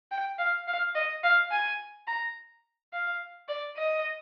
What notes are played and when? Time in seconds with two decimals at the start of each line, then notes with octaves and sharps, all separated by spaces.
0.11 G5
0.39 F5
0.68 F5
0.95 D#5
1.24 F5
1.51 G#5
2.08 A#5
2.93 F5
3.48 D5
3.77 D#5